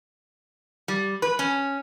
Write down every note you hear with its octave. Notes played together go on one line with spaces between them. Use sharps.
G3
B4
C#4